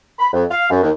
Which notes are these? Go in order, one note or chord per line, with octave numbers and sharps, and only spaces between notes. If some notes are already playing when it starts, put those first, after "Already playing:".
B5
F2
F5
F#2
D#2